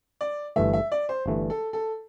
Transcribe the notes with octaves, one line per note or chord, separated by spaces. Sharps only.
D5
G1 G2 E3 A3 E5
E5
D5
C5
G1 G2 E3 A3
A4
A4